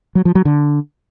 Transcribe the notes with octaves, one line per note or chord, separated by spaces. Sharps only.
F#3
F3
F#3
D3